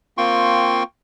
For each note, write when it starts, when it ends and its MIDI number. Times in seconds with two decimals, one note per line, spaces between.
0.18 0.83 58
0.18 0.83 60
0.18 0.83 65
0.18 0.83 79
0.18 0.83 84
0.18 0.83 85